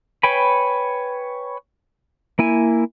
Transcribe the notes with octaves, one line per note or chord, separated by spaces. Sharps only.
B4 C#5 G5 G#5 B5
A#3 E4 G#5